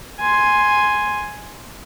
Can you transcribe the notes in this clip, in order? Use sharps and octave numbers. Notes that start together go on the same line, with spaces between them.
G#5 C6